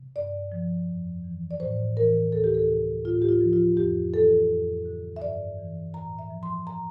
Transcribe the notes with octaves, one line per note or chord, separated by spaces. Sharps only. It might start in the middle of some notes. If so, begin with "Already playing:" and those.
Already playing: C3
G2 D5
F3
F2
E3
D5
A2 C5
E3 A#4
D2 A4
G4
A4
C3
A2 F4
G4
F4
F3
F4
F2 G4
E3 A4
F2
D3
E5
G2 D5
E3
A2 A#5
E5
F3
C6
A#5